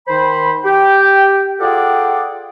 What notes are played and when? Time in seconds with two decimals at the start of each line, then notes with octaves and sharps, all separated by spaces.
0.08 D#3 C5 B5
0.64 G4 G5
1.60 F4 G#4 A4 D5 F#5 G5